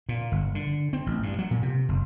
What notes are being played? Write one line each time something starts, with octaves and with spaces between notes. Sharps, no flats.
A#2
G1
D3
C4
A1
G2
F#3
A#2
C3
F#1